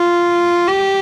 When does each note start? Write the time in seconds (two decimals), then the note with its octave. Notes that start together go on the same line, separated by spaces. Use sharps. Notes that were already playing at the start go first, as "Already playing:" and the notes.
Already playing: F4
0.67 G4